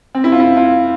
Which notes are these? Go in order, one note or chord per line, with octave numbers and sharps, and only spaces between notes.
C4
E4
F4
E4
F4